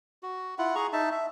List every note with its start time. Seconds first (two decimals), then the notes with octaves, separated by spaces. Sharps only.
0.23 F#4
0.58 E4 F4 F#5
0.75 G#4 A#5 C#6
0.93 D#4 E5 A5
1.12 E5